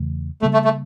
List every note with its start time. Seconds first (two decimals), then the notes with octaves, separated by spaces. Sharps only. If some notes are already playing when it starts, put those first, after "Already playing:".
Already playing: E2 C#3 E3 A3
0.42 C#3 G3 A3 A#3
0.53 A3
0.64 A3